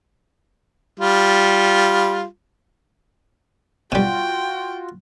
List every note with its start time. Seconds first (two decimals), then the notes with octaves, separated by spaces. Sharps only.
1.00 G3 F4
3.92 B2 G3 F4 F#4 G5